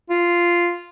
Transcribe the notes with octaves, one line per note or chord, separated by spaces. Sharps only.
F4